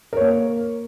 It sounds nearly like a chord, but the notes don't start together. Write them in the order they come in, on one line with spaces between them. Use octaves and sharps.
A#4 C#5 A#3